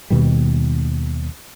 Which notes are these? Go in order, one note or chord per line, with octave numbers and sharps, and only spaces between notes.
D#2 B2 D#3 G3